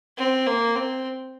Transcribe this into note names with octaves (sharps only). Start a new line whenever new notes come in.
C4
A#3
C4